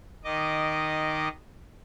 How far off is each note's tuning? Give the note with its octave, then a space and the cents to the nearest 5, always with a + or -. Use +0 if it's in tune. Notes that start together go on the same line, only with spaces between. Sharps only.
D#3 +0 D#5 -10 D6 +0